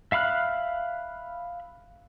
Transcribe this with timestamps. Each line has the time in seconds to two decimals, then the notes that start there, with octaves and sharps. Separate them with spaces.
0.12 E5 F5 B5 F6 F#6